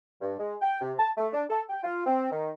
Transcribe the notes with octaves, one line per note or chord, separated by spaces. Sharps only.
G2
G#3
G5
C3
A5
A3
D4
A4
G5
F4
C4
D#3